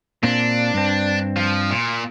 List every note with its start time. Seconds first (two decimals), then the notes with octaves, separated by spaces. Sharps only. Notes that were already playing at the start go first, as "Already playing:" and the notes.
0.23 A#2 A#3 C4 D4
0.74 G2 C4
1.36 F3
1.71 A#2